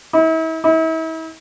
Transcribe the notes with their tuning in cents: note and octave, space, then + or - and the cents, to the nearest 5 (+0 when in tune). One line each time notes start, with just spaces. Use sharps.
E4 -40
E4 -40